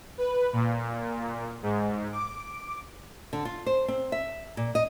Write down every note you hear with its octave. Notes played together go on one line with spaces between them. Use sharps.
B4
A#2
G#2
D6
D3
F4
C5
C4
E5
A#2
D#5